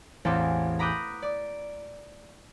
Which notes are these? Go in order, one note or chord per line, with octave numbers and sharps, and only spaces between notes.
A1 E2 C4 A4 F5 D6
A#5 B5 D6 D#6 F#6 G6
D5